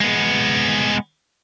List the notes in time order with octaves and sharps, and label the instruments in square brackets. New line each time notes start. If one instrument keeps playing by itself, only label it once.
[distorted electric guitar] G#3 B3